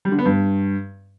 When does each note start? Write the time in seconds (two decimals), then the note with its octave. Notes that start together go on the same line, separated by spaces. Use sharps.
0.05 G3
0.12 D3
0.19 B3
0.25 G2